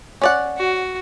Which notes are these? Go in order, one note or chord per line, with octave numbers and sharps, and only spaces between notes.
C#4 D5 F#5
F#4